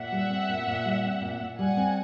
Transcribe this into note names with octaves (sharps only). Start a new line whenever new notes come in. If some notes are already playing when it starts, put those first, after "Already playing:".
Already playing: A#2 E5 F#5
G3
C4
A#2
A#2
G3
C4
A#2
A#2
G3 F#5 G#5
C4